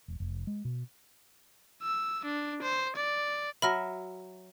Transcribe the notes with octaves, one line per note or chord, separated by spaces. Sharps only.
E1
F1
G#3
B2
E6
D4
C5
D5
F#3 E5 B5 F6 A#6